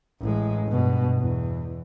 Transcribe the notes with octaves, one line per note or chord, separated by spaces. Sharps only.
A1 G#3
G2 B2
E2